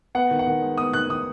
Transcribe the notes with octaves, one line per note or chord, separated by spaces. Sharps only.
B3 F#5
D#3
F#5
D#3
G#3
B3 D#6
D#3 F#6
D#3 D#6